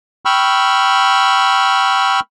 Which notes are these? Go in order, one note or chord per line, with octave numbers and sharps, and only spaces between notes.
G5 B5 C#6 E6 F6